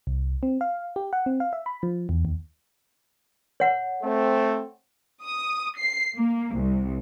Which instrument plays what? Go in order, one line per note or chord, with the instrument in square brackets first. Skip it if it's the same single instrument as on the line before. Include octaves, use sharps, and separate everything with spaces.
[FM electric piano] C2
C4
F5
G4
F#5
C4
F5
E5
B5
F3
E2
D#2
[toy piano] C#5 F#5
[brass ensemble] A3 C4
[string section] D#6
C7
A#3
C2